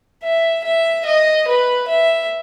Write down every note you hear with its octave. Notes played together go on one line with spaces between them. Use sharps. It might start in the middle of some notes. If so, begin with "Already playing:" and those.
E5
E5
D#5
B4
E5